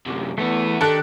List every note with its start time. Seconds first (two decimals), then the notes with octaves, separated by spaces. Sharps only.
0.06 F#2 C3
0.38 E2 E3 A3 B3
0.81 D#3 D4 G4 A4 F#6